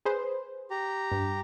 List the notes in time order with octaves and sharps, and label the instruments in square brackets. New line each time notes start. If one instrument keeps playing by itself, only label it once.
[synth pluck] G#4 B4 C5
[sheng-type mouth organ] G4 A#5
[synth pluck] G2